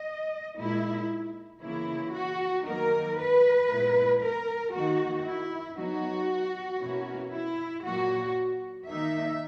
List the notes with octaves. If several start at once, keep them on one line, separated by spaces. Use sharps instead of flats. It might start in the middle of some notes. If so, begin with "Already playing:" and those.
Already playing: D#5
A#2 G#3 D#4 E4
C#3 E3 A#3 E4
F#4
D#3 F#3 A#3 D#4 A#4
B4
A#2 G#3 B3 E4
A#4
D#3 A#3 D#4 F#4
E4
F#3 B3 D#4 F#4
B2 A#3 C#4 E4
E4
A#2 F#3 A#3 F#4
D#3 A#3 D#4 E5